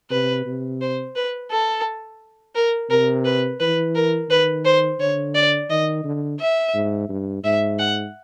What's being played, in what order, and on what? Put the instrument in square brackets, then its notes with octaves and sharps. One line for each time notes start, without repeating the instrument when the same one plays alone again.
[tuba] C3 [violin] B4
[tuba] C3
[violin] C5
B4
A4
A#4
[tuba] C3 [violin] A#4
[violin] B4
[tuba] E3 [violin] B4
[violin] A#4
[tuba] D#3 [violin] B4
[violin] C5
[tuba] D3 [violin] C#5
[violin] D5
[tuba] D#3 [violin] D#5
[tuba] D3
[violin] E5
[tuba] G#2
G2
[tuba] G#2 [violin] E5
[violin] F#5